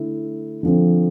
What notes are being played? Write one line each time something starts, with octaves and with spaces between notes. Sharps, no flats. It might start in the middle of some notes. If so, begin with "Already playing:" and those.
Already playing: D3 A3 E4
D3 F3 C4